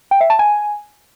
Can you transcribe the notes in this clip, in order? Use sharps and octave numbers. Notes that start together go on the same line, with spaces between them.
G5
E5
A5
G#5